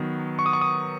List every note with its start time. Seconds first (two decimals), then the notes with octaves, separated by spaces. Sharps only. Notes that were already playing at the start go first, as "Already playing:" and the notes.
Already playing: D#3 F#3 B3
0.39 C#6
0.46 D#6
0.53 C#6
0.61 D#6